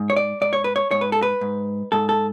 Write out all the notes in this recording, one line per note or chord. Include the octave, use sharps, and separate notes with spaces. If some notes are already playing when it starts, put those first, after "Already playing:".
Already playing: G#2
C#5
D5
G#2 D5
C#5
B4
C#5
G#2 C#5
B4
A4
B4
G#2
G#2 A4
A4